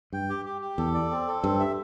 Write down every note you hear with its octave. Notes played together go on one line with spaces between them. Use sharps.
G2 G5
G4
G4
G4
E2 A4
D5
C4
A4
G2 C4
E5